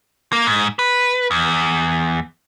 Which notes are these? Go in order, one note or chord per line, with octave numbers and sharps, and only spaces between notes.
A#3
G#2
B4
E2